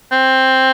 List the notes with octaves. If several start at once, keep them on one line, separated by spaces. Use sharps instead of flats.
C4